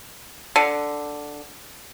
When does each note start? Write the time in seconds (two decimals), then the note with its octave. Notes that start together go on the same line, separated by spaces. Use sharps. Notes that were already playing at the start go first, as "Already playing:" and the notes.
0.56 D3